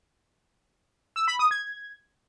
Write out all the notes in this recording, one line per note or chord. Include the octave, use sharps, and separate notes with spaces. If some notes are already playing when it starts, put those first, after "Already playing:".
E6
B5
D#6
G#6